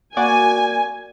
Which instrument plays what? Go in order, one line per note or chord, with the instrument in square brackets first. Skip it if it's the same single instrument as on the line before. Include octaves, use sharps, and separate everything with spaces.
[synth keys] A#3 F#4 D5 [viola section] G#5